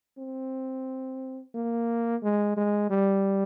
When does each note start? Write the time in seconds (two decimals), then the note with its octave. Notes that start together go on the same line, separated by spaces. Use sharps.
0.19 C4
1.55 A#3
2.23 G#3
2.57 G#3
2.90 G3